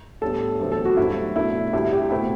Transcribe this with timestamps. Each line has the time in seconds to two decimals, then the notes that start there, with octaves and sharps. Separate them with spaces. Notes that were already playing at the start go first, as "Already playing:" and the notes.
0.21 A2 G3 B3 D4 A4
0.60 E2 D3 F#3 A3 C4
0.72 A4
0.85 F#4
0.97 G2 D3 F#3 A3 C4 E4
1.36 B2 A3 D4 E4
1.73 D2 C3 G3 D4 E4
1.93 G4
2.11 B2 A3 C4 E4